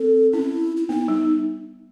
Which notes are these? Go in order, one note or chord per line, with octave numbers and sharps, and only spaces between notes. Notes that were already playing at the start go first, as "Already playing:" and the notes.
Already playing: C4 A4
C#4 E4
E4
B3 D#4
G3